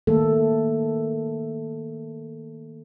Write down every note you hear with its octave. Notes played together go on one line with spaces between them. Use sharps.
D#3 A3 A#3 A4